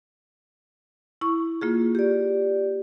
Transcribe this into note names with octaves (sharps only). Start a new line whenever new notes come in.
E4 C#6
A#3 F4 G#4
G4 D5